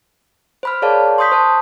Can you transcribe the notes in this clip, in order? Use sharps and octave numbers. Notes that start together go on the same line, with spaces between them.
C5 B5 F6
G#4 A#4 C#5 D5 F5 A5
C6 C#6 D#6 G6 B6
C5 A5